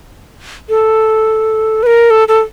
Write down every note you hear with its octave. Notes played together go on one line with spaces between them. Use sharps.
A4
B4
A#4
A4
A4